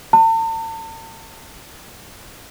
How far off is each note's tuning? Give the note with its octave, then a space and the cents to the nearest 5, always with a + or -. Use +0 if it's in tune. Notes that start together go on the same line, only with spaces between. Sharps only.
A5 +40